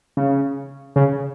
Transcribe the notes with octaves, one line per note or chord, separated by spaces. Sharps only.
C#3
C#3